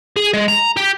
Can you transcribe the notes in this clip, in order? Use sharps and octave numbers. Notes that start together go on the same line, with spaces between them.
G#4
G#3
A#5
G4